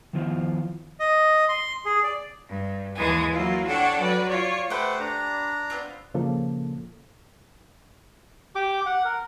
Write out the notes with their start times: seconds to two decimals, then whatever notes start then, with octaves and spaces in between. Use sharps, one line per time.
0.13 D#3 F3 B3 E4 F4 C5
1.00 D#5
1.49 C6
1.85 G#4
2.04 D5
2.47 G2
2.94 D#2 E3 G#3 G#5
3.32 F#3 A#3 E4 F4
3.64 D4 A4 C#5 F#5 G5 D6
3.98 F#3 B4 D5
4.27 F4 C#5 D5
4.70 A3 G4 B4 C5 F#5
5.00 D4 A#5
5.70 B3 C4 F4
6.14 A#2 C#3 F3 A#3 A4
8.55 G4 D6
8.86 F#5
9.05 A#4